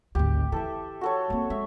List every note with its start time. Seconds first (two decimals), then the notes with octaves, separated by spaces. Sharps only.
0.15 G#1 D2 G4
0.52 E3 A4 E5
1.01 F#4 A4 C#5
1.30 A#3 C4
1.50 G#3 E5